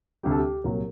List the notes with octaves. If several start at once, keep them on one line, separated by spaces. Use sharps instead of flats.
D2 C3 G3 G4
A4
G4
C2 A#2 F#3 A#4